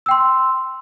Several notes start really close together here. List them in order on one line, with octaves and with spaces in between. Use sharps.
E6 G5 C6